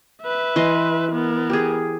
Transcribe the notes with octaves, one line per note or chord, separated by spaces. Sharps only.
B4 E5
E3 D#5 C6
B3 A#4
G4 G#4